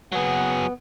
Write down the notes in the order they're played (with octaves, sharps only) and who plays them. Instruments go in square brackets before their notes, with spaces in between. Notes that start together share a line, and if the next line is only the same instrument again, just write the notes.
[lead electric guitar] F#3 G#4 [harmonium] B3 [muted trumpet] F#5